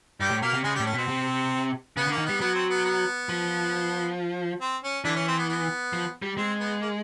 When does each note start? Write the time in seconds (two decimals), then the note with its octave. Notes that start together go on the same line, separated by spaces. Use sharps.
0.20 G2 G3 G4
0.31 A2
0.42 B2 A#3 A#4
0.54 C3
0.64 C#3 G#3 G#4
0.75 G3 G4
0.80 A2
0.86 C#4
0.93 B2 C4
1.08 C3
1.97 C#3 B3
2.07 D3
2.12 A#3
2.18 D#3
2.26 G3 B3
2.41 F#3 B3
2.55 C4
2.70 B3
2.85 B3
3.29 F3
4.61 C4
4.84 C#4
5.04 D3 E3 D4
5.16 C#4
5.28 C4
5.38 B3
5.49 B3
5.93 F3
6.22 G3
6.37 G#3 C4
6.60 B3
6.81 A#3